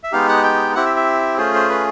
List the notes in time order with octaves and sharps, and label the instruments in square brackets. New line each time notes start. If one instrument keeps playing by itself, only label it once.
[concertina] E5
G#3 B3 D#4 G4 F5
F#5
G5
C4 E4 G4 F#5
E5
E5
A3 C#4 F4 G#4 C5
C5
B4